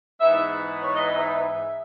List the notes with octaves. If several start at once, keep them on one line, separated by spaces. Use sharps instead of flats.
G#2 E3 B3 D#4 E5
C#5
D#5
E5